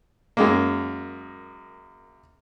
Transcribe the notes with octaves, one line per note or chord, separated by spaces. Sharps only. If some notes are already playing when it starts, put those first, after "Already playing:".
F#2 G#3 A#3